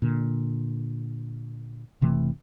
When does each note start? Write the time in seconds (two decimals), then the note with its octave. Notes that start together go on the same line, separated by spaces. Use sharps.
0.02 A#2 D3
2.01 F#1 C3 E3 A3